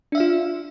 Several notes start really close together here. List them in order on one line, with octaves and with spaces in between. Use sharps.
D4 E5 F5 F4